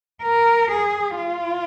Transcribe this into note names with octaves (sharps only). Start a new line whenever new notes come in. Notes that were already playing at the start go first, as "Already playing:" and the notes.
A#4
G#4
F4